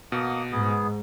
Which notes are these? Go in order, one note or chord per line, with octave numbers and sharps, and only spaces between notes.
B2 A#3 F#5 D#6
G#2 B3 G#4